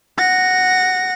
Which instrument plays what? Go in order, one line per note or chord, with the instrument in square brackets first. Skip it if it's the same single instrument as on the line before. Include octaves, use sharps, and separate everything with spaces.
[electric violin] F#5 A#6